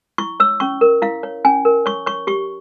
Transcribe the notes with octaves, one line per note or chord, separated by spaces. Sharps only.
E4 C#6
C#5 E6
C#4 C#6
A#4
E4 F5
C#5
C#4 G#5
A#4
C#5 C#6
C#5 C#6
G4 C#6